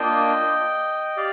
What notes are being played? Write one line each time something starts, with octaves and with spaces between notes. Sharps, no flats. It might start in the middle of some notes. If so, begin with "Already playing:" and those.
Already playing: A#3 D4 F4 D#5 G5
G4 D5 F5